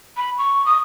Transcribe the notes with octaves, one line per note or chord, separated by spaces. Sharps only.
B5
C#6
D#6